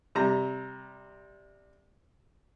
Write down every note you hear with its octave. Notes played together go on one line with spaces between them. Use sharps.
C3 G3 A#5